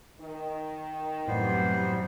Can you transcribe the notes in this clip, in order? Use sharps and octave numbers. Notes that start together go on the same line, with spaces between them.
D#3
F#2 A2 C3 E3 G3 B3 C5